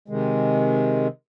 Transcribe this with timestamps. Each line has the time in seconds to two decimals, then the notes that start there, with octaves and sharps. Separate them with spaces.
0.08 C3 D#3 G#3